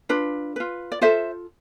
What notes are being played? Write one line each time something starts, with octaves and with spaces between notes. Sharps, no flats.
D4 F4 B4
F4 B4
D5
F4 A4 C5 E5